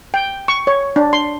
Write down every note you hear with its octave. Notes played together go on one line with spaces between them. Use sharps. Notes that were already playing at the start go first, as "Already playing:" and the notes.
G5
C#6
C#5
D4
C6